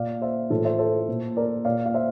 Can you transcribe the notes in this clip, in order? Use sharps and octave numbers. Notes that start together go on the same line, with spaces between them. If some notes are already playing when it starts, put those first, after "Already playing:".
Already playing: A#2 D5 F5
C5 E5
A2 E3 F4 A4
C5 E5
A4 C5
A#2
A#4 D5
A#2 D5 F5
F5
C5 E5